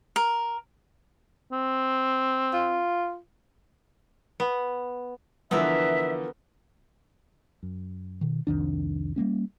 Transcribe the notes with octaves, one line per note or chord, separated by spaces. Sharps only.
A#4
C4
F4
B3
D3 E3 F3 B3 A#4 E5
F#2
B2 D#3
C2 F2 D#3 D4
G3 A3 A#3 C#4